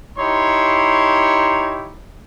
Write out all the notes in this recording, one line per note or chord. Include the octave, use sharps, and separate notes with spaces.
D#4 E4 G4 C#5 A#5 C6